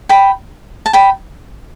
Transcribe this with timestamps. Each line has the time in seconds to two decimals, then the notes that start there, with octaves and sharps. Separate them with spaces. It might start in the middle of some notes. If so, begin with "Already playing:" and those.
0.09 G5 B5
0.86 A5
0.93 G5 B5